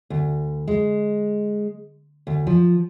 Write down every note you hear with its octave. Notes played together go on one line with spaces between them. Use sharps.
D2
G#3
D2
F3